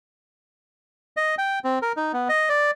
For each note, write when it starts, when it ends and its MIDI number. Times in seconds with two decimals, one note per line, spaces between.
1.17 1.35 75
1.38 1.59 79
1.64 1.79 60
1.82 1.92 70
1.97 2.12 63
2.13 2.28 59
2.29 2.49 75
2.49 2.71 74